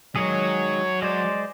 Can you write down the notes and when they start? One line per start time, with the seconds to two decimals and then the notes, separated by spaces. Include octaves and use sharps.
0.16 D#3 F#3 G#3 G#4 C#5
1.02 G#3 C5 D5